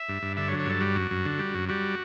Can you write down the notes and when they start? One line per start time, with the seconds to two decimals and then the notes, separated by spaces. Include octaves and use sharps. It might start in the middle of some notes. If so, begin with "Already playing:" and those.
Already playing: E5
0.09 G2
0.22 G2
0.37 D3 E5
0.48 C#5
0.52 F#3
0.60 C#5
0.66 G2 A4
0.81 G3 F#4
0.96 F#2
1.11 F#2
1.26 D3
1.39 G3
1.55 F#2
1.69 G3 F#4